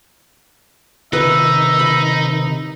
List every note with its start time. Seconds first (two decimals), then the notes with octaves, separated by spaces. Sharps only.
1.13 C3 D#3 D#4 B4 E5
1.79 B5